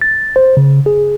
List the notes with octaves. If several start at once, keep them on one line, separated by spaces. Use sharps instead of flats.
A6
C5
C#3
G#4